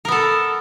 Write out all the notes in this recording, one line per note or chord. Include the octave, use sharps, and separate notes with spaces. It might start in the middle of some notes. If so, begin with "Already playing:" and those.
B3 A4 A#4